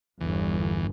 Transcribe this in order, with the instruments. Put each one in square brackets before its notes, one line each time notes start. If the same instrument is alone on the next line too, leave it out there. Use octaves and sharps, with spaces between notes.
[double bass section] G1 [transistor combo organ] E2